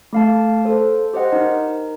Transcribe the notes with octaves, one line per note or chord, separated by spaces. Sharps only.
A3 F5 A5
A4 C5
G4 C5 D#5 F#5
D#4 A#4